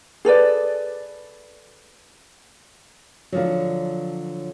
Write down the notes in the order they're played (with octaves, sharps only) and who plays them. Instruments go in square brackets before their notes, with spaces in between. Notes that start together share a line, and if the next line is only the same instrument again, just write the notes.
[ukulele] G#4 A4 B4 D5
[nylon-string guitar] D3 F3 F#3